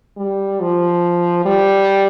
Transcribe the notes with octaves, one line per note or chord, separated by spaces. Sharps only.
G3
F3
G3